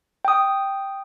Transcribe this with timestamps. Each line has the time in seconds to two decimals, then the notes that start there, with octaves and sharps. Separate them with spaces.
0.25 G5 D#6